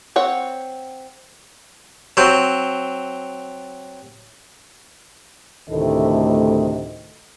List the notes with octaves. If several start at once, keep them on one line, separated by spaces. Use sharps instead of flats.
C4 C#5 F#5
F#3 C4 C6
D2 A2 C3 D#3 A3 D#5